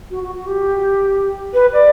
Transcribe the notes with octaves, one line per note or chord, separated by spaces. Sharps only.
F#4
F#4
F#4
G4
B4
D5